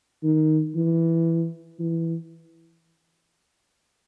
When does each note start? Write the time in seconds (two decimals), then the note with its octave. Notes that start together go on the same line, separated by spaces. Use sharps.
0.23 D#3
0.75 E3
1.79 E3